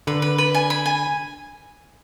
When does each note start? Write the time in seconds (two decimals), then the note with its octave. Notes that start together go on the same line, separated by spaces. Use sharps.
0.07 D3 B4
0.22 B4
0.38 B4
0.54 G#5
0.70 B5
0.86 G#5